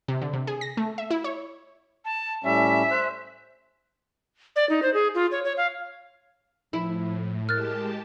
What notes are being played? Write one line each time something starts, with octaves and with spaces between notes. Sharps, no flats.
C3
D3
C3
G#4
A#6
A3
E5
E4
C#5
A5
A2 G3 C#4 E5
C5 F#6
D5
D#4
C5
G#4
F4
C#5
C#5
F5
A2 F3 E4
G#3 G4 A#4 A5 F6 F#6 A6